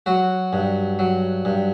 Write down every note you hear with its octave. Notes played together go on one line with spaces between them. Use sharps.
F#3 F#4
G2
F#3
G2